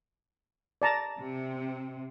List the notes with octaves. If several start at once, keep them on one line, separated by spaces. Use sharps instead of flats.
D5 A5 A#5
C3